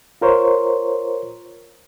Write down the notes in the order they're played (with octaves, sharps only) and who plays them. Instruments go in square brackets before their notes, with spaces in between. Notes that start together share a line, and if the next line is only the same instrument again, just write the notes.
[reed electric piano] F4 A#4 C5 C#5